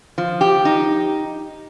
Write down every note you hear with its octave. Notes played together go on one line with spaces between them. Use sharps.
F3
G4
D#4